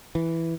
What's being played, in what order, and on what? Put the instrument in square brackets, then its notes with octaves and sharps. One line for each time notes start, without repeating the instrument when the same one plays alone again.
[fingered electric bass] E3